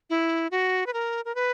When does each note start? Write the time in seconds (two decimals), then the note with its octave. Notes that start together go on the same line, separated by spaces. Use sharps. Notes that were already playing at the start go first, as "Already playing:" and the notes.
0.10 E4
0.51 F#4
0.86 B4
0.93 A#4
1.25 A#4
1.35 B4